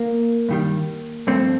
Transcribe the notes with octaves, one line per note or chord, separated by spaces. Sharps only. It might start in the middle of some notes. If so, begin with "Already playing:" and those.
Already playing: A#3
G2 D#3 G3
G2 F3 A3 C4